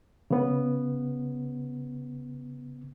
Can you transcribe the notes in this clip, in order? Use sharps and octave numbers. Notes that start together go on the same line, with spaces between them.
C#3 B3